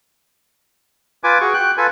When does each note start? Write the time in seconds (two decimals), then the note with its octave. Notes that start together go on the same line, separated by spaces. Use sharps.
1.24 F4 B4 G#5 D6
1.41 F#4 G#4 C#6
1.54 G5 F#6
1.77 F4 A4 B4 G#5